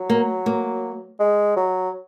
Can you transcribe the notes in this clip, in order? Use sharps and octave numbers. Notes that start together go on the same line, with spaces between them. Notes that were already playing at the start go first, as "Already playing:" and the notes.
Already playing: F#3
A#3
A#3
G#3
F#3